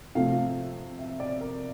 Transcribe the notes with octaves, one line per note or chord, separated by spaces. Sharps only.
C3 F3 A3 F5
E5
D5
A#4